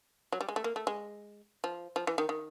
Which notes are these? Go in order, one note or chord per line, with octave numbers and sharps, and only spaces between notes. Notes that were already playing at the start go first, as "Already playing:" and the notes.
F#3
G3
G#3
A3
A#3
A3
G#3
F3
F3
E3
D#3
D#3